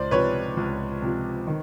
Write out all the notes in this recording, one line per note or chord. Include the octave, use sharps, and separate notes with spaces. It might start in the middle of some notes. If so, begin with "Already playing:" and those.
Already playing: C#2 C5 D5
C3 F3 B4 C#5
C#2
C3 F3
D#3